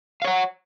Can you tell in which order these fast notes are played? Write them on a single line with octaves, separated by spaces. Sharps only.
F5 C#5 F#5